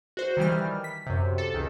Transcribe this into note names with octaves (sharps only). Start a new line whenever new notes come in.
F#4 C5
D#3 E3 G3 F6
B6
F#2 C3
A4
C#2 D#3